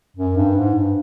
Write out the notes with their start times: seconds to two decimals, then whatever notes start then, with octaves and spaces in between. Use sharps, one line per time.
0.17 F#2
0.37 G2
0.56 G#2
0.75 G2